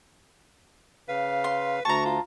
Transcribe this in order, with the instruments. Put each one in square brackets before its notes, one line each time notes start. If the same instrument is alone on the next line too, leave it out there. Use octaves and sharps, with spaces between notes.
[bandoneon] C#3 F5 [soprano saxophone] B4
[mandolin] C6
[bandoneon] D2 [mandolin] A5 A#5 [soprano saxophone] C#6
[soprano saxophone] F4